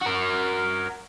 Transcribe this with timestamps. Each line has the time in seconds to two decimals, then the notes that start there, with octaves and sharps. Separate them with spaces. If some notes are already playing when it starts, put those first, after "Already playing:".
0.02 F#4 A#4